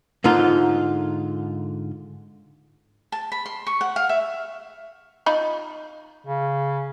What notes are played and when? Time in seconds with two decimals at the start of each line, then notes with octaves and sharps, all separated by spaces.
0.24 G#2 D3 D#4 F4
3.12 A5
3.32 B5
3.46 C6
3.67 C#6
3.81 F#5
3.96 F5
4.09 E5
5.26 D#4 F4 B5
6.27 C#3